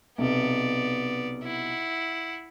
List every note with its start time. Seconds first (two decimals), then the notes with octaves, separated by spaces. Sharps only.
0.18 B1 C3 B3 D5
1.44 E4 F#5